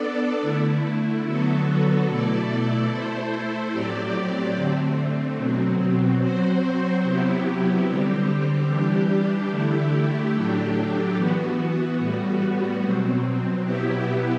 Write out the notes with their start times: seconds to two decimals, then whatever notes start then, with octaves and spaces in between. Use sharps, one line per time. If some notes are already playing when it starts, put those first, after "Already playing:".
Already playing: B3 D4 A4 D5
0.42 D3 A3 E4
1.25 D3 F#3 B3 F#4 A4
2.07 B2 A3 E4 A4 D5
2.90 A3 E4 A4 C5
3.72 A2 F#3 C4 G4 D5
4.55 D3 A3 C4
5.37 B2 F#3 C4
6.20 F#3 C4 F#4 C5
7.03 C3 F#3 B3 E4 G4
7.85 D3 G3 C4 G4
8.68 E3 G3 D4 G4
9.51 D3 A3 E4 G4
10.33 A2 F#3 A3 D4 G4
11.16 E3 B3 F#4
11.98 A2 G3 B3 F#4
12.81 B2 F#3 C4
13.64 B2 F#3 B3 E4 G4